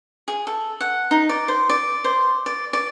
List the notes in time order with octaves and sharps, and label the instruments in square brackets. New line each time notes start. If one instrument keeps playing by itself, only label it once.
[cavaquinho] G#4
A4
F#5
D#4
D5
C5
D5
C5
D5
D5